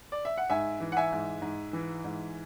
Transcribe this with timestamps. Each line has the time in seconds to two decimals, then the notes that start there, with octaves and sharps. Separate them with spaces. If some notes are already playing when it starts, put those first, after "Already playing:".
0.12 D5
0.25 E5
0.37 F#5
0.50 G#2 E5 G#5
0.80 E3
0.92 F#5
0.97 E5 G#5
1.12 G#2
1.42 G#2
1.73 E3
2.04 G#2